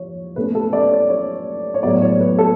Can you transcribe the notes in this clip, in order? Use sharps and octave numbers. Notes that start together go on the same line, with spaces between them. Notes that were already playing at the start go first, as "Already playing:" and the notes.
Already playing: F3 C#5
B2 A3 C#4 B4
A4
D5
C#5
C#5
C#5
A2 F#3 B3 D5
C#5
B4
A4